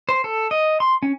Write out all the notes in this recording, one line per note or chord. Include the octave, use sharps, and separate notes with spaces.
C5
A4
D#5
C6
C#4